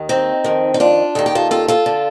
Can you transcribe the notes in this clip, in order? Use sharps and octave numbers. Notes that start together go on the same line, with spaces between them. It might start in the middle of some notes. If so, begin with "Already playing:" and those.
Already playing: D#2 D#3
C4 D#4
F2 D#3
D#4
D4 F4
D#2 D#3 A4
G4
F4 A4
F4 A4
F4 A4
D3